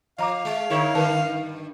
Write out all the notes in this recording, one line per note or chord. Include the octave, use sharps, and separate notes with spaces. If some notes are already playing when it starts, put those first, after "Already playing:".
F3 D#5 F5 A#5 D6
G#3
D3 D#4 E4 A#4 C#5 C#6
G2 D3 D#3 A#4 B4 A5